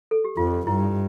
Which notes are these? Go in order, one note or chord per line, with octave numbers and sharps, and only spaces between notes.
A4
G4
F2 F4
G2 E4